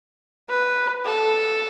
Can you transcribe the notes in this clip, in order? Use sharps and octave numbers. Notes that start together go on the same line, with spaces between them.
B4
A4